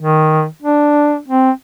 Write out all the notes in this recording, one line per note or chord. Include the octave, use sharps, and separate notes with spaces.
D#3
D4
C4